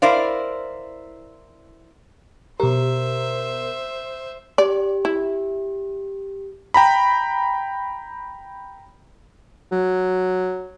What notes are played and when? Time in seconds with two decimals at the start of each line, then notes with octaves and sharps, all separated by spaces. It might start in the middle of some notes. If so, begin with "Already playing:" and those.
0.02 E4 A#4 C5 D5 F5
2.60 B2 G4 A#4 C5 E5
4.58 G4 D5
5.05 E4
6.74 G5 A#5 B5
9.72 F#3